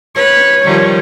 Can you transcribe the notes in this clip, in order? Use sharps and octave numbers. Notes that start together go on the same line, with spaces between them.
B4 C#5
D#3 F3 G3